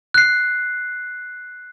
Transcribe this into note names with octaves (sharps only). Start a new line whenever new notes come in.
F#6 C7